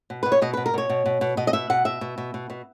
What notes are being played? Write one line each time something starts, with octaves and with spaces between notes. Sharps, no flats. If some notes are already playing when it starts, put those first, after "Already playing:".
B2
B2 B4
C#5
B2 D#5
B2 B4
A#4
B2 C#5
B2
B2
B2
B2 D#5
D#5
B2 E5
B2 F#5
B2 E5
B2
B2
B2
B2